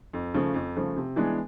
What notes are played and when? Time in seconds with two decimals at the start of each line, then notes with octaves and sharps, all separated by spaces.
0.13 F2
0.34 C#3 F3 A3
0.54 F2
0.76 C#3 F3 A3
0.96 C3
1.16 E3 G#3 B3 D4